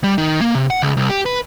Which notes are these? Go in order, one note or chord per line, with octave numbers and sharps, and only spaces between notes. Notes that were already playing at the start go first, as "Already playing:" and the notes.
G3
D#3
A#3
C3
F#5
C#2
C2
G4
B4